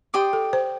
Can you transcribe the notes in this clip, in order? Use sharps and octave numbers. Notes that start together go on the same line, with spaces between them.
G4 D5 G5 C6 D#6
A4
C5